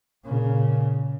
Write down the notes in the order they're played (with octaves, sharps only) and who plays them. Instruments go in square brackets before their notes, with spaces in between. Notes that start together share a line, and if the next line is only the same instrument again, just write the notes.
[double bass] A#2 C#3